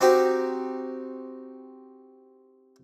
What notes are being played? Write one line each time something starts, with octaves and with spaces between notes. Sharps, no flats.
C4 D#4 F#4 G4